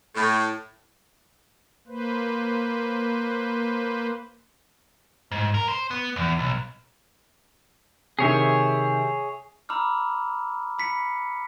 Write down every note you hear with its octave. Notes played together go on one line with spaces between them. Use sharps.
A2
A#3 B4 C5
G#2
A#4
C5
B3
E2
B1
C3 D#3 G#4 C#5 E5
A#5 B5 D6 E6 F6
B5 B6 C#7